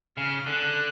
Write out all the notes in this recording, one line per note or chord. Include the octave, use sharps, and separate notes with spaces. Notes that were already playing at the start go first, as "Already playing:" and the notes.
C#3 F6
D3 F#6